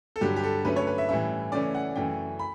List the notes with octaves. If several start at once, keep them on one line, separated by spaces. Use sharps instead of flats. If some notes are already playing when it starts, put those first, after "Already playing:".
A4
G2 D3 F#3 G4
G4
A4
G2 D3 F#3 A3 C#4 B4
C#5
B4
E5
A2 E3 G3 C#4 E5
C#3 E3 A3 C#4 D5
F#5
F#2 C#3 E3 A3 G5
B5